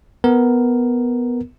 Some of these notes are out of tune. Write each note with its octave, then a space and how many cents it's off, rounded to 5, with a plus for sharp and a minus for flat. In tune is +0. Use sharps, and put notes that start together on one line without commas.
B3 +0 A#4 +0